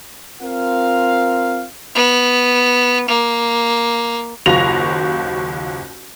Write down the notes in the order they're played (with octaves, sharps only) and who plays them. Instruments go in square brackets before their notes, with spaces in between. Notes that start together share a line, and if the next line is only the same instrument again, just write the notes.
[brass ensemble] C4 F4 A#4 F5
[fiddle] B3
A#3
[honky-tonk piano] F#1 D#2 F4 F#4 A#6 F7